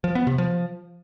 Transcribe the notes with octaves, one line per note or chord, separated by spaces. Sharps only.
F3
B3
C3
F3